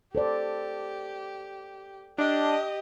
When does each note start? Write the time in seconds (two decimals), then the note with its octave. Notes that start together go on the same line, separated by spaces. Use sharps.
0.15 G4 A4 C5 D5
2.18 D4 G4 D#5